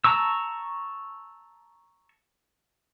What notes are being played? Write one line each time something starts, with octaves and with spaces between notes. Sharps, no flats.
A5 A#5 C#6 E6